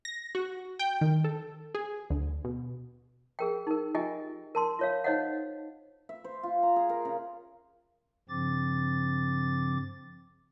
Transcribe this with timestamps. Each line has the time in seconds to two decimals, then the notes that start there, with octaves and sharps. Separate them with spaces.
0.05 A#6
0.35 F#4
0.79 G5
1.01 D#3
1.24 A4
1.75 G#4
2.10 D2
2.45 B2
3.39 G#4 A#4 G5
3.67 D#4 A#4
3.95 F4 G4 D#5 G5 G#5
4.55 A#4 A5 C6
4.79 F4 C#5 F5
5.04 D#4 C5 C#5 D#5 F5 F#5
6.09 E5
6.24 C5
6.43 F4
6.63 A#5
6.76 G#4
6.89 A#4
7.05 C#3
8.29 G2 C#3 F3 C4 D6 A6